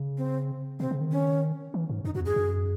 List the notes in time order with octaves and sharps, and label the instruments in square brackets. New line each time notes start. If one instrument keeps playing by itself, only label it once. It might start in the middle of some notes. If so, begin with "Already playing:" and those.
Already playing: [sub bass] C#3
[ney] C4
[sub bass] C3 [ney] C4
[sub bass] C#3
D#3
[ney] C#4
[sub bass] E3
G#2
[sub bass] F#2 [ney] D#4
[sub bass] F#2 [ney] F#4
[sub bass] E2
[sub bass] F#2 [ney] G#4
[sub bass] F#2